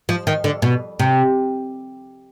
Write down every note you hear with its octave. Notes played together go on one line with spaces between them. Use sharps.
F3
D#3
D3
B2
C3